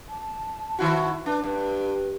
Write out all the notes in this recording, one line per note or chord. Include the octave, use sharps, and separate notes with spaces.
A5
D#3 E4 F#4
D4 B4
G2 B4